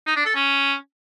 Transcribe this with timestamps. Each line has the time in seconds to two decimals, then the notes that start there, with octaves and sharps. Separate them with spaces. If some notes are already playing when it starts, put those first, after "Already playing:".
0.07 D#4
0.16 D4
0.26 A4
0.35 C#4